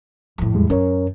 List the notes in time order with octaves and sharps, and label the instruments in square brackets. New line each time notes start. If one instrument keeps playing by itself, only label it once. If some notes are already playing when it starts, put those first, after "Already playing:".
[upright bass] F2 A2
[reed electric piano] E2 G3 G#3
[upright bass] F#2 [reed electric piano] C#4 A#4 C#5